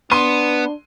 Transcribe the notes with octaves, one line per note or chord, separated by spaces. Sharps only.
B3 D4 C6 D#7